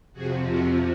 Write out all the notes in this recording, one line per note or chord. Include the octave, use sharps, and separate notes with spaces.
F2 C3 F3 F#4 G#4
F#4